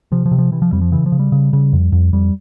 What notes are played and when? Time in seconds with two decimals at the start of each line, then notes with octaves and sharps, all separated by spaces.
0.12 C3 F3
0.26 F3
0.31 C3
0.38 F3
0.52 C3 E3
0.62 F3
0.72 F2 G3
0.81 F3
0.92 C#3 E3
1.06 F3
1.12 C#3
1.19 G3
1.32 C#3
1.53 C#3
1.73 F2
1.92 F2
2.13 F2 G3